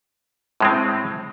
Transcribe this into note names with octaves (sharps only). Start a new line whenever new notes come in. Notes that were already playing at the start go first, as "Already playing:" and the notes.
A2 G#3 C4